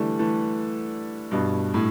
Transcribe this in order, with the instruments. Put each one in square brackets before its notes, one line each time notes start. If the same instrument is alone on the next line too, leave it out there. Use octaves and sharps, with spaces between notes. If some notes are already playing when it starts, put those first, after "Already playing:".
Already playing: [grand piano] D3 E3 G3 A3
E3 A3
G2 B2
A2